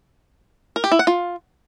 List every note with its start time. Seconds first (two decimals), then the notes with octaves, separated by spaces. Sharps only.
0.76 A#4
0.84 G4
0.92 E4
0.99 F#5
1.07 F4